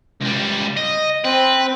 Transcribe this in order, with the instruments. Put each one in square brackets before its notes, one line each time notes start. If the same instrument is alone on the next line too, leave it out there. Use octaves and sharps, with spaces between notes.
[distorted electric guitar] C#2 G3
D#5
[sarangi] C4 [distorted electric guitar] B4